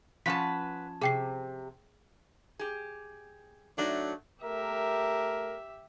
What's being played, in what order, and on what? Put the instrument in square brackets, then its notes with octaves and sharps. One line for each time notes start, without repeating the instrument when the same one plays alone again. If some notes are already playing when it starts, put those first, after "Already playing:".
[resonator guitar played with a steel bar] F3 C#4 A5 [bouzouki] B4 F#5 [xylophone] B6
[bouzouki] C3 [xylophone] G#4 G5 C7
[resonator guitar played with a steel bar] G4 G#4
[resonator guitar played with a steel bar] F#3 A3 D#4 [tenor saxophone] D4
[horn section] A3 A#4 [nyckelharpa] G4 E5